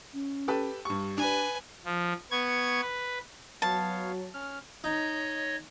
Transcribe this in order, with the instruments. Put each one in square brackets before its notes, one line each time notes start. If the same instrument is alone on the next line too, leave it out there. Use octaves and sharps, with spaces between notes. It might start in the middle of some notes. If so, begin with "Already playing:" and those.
[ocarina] C#4
[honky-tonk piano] G4 A4 B4
[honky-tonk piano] G2 C#6 [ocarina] G4
[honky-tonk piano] D4 [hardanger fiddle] B4 G#5
[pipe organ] F3
B3 C#6 G#6
B4
[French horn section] F#3 [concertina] B3 C#5 F5 [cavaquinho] A5
[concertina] C#4 F6
[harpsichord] D#4 [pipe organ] C#5 D#5